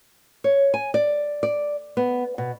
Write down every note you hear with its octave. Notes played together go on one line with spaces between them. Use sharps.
C#5
G#5
D5
D5
B3
B2